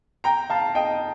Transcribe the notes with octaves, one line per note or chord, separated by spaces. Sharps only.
G5 A#5
F5 A5
D#5 G5